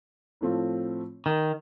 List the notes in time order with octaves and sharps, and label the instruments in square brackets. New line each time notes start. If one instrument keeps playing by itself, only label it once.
[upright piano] A2 F3 A3 C4 F4
[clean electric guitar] D#3